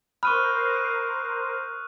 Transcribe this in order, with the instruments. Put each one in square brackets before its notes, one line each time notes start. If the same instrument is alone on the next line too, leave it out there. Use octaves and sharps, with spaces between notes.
[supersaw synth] A#4 C5 [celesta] B5 [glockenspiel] C#6 F6 [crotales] D#6 F#6 D#7